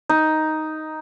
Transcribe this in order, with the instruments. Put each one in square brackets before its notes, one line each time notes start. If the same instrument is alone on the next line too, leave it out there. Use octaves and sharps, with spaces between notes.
[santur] D#4